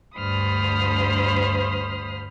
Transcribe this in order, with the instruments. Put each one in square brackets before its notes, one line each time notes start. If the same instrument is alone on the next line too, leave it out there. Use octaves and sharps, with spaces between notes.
[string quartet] D2 G2 C5 B5 D#6 F6